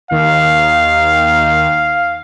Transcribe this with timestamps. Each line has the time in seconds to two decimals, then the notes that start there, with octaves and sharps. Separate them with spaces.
0.11 D#2 D#3 F5